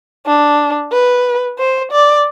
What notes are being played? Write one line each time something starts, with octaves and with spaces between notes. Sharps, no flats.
D4
B4
C5
D5